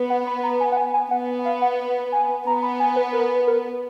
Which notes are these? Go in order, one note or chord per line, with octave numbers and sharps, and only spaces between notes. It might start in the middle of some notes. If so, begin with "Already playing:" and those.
Already playing: B3
F#5
B5
A#5
G#5
F#5
G#5
G#5
B3 F#5
F5
F#5
G#5
B3 A#5
B5
G#5
B4
A#4
B4
A#4